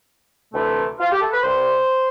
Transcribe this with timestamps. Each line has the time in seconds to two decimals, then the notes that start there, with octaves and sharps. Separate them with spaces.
0.53 D2 C3 E3 A3
1.00 F4
1.11 G4
1.22 A4
1.33 B4
1.43 C2 C3 G3 C5